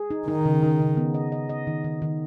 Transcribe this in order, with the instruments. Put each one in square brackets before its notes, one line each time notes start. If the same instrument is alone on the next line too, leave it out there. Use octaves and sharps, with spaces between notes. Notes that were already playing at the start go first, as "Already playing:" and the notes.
Already playing: [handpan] G#4
D#4
[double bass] D#3 [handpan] D#4
[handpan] C#3
D#4
C#3
B3
D#5
D#5
D#5
D#3
D#3
D#3